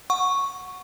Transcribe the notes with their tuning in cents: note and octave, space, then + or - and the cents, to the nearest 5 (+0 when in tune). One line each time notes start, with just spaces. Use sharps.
F#5 -10 C#6 +0